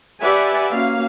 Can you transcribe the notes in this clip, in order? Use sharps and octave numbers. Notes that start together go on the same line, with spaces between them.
G4 B4 D5 E5 F#5 G#5
A#3 C#4 F#4 F5